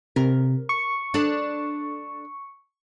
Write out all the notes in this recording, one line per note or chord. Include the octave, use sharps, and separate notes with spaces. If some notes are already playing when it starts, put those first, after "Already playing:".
C3 A#4
C#6
D4 A4 D5